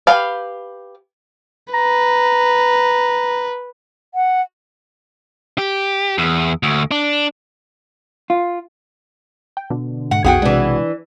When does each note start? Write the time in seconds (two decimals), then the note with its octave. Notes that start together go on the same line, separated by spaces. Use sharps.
0.07 G4 B4 F5
1.74 B4 A#5
4.15 F#5
5.58 G4
6.18 E2
6.63 D2
6.91 D4
8.30 F4
9.57 G5
9.70 B2 D3
10.11 G#2 F#5
10.24 B1 F2 B3 F#4 G#4 F#5 G5
10.42 C3 E3 G#3 D4